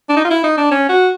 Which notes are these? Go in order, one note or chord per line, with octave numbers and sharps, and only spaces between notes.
D4
D#4
F4
E4
D#4
D4
C#4
F#4